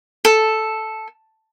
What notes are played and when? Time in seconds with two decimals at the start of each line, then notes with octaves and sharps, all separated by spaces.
0.25 A4